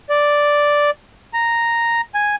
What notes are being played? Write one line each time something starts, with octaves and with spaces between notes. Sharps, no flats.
D5
A#5
G#5